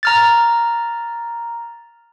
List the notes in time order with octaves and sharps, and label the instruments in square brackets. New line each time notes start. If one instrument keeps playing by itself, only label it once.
[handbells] A#5 F6 A6